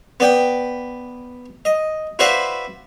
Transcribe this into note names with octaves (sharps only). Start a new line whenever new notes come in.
B3 D5 G5
D#5
E4 F#4 B4 C5 D5 F5